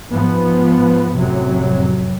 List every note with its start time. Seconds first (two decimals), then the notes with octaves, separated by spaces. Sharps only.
0.11 G#2 F3 B3
1.16 F1 F#2 A2 C3 F#3